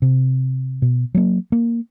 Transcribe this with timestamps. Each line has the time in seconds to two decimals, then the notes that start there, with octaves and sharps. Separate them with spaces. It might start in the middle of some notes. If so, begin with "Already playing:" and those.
0.02 C3
0.82 B2
1.14 F#3 A#3
1.52 A#3